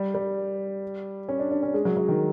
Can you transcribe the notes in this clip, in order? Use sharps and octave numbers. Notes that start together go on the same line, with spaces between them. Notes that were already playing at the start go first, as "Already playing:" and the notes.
Already playing: G3
G3
C#4
D4
D4
C#4
G#3
F#3
F#3
D#3